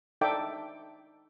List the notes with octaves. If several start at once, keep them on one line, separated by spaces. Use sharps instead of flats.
D#4 A4 D5 E5 G5 D6